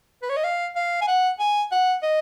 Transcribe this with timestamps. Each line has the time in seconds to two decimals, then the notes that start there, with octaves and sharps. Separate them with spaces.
0.22 B4
0.30 C#5
0.37 D#5
0.44 F5
0.76 F5
1.02 G#5
1.08 F#5
1.40 G#5
1.72 F#5
2.03 D#5